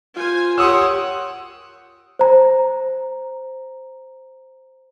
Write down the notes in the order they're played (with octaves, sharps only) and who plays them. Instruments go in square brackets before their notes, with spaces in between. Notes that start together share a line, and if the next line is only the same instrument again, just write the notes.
[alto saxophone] F4 [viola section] C5 G#5
[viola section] G4 A#4 [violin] C#5 F#5 [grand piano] C6 D#6 E6
[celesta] C5 A#5